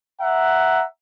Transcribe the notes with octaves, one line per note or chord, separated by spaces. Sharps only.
E5 F#5 A#5